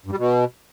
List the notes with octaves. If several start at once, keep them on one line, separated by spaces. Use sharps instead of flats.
G2
G3
B2